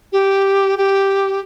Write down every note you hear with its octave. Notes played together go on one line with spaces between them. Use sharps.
G4
G4